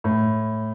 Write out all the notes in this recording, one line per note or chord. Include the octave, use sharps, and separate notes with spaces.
A2